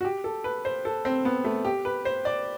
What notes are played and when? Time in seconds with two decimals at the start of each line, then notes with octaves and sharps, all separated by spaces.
0.01 F#4
0.05 G4
0.24 A4
0.44 B4
0.65 C5
0.85 A4
1.05 C4
1.25 B3
1.44 A3
1.65 G4
1.85 B4
2.05 C5
2.25 D5